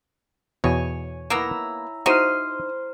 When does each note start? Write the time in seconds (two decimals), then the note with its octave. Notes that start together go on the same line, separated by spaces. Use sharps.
0.64 E2 B2 C#5 G#5
1.30 A#3 B3 E4 A#5 E6
2.06 D#4 E4 F#4 C5 F6 C7 D#7